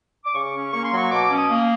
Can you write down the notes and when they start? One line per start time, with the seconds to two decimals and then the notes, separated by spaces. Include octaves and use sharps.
0.25 D6
0.34 C#3 C#6
0.54 C#4
0.72 A#3 C#6
0.84 C6
0.92 F#3 C#6
1.10 B2 D6
1.30 C#4
1.36 D#6
1.49 A#3